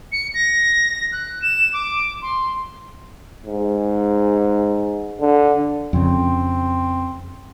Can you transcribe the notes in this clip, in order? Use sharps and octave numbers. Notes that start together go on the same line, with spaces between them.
C#7
A#6
F#6
E7
D6
C6
G#2
D3
F2 C#3 C4